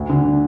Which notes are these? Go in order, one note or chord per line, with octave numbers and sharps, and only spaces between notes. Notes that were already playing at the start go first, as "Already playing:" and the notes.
Already playing: D2
D3
D4